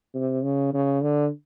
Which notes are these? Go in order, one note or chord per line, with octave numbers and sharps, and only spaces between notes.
C3
C#3
C#3
D3